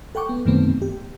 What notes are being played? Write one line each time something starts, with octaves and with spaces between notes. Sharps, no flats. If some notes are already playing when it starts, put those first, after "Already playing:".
A4 F#5 G5 C#6 D6
B3
F#2 B2 D#3 A3 B3 C4
G4